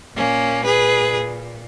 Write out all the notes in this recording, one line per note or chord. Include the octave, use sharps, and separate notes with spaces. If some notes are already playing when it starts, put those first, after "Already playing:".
A#2 A#3 C#4
G#4 B4